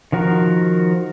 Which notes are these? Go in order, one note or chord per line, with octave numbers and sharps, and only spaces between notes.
D#3 F3 F#4 A#4